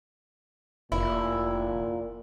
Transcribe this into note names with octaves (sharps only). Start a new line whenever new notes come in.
F1 A#2 E4